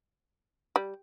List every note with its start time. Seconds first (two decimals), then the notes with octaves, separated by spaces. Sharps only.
0.76 G3